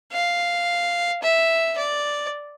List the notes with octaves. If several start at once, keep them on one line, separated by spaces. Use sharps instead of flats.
F5
E5
D5